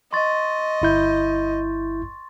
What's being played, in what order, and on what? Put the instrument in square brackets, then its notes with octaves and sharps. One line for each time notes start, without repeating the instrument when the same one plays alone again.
[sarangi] D#5 [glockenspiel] C6 C#6 A6
[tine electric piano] G1 E4 G6